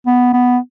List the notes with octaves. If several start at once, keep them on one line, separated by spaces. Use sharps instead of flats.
B3
B3